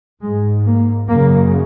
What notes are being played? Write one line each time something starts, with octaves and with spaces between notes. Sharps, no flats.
G#2 G#3
A#3
F#2 C#3 A#3